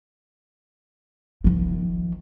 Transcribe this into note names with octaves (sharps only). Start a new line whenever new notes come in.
D#3 F3